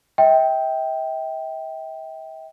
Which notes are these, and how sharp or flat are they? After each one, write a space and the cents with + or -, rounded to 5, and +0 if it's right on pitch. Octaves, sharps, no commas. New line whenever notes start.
E5 -45 G5 +0